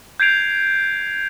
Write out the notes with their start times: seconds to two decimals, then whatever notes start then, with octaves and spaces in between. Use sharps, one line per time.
0.20 G6 G#6 C7 D7 F7